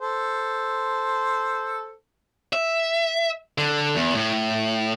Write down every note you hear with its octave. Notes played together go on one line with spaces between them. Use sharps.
A4 C5
E5
D3
E2
A2